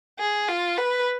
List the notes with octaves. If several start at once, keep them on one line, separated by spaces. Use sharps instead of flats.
G#4
F4
B4